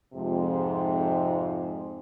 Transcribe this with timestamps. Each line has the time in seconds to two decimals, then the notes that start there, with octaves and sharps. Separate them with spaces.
0.13 F2 G#2 C3